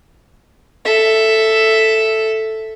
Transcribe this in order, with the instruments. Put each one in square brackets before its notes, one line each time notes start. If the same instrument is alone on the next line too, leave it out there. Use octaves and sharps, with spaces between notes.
[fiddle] A4 E5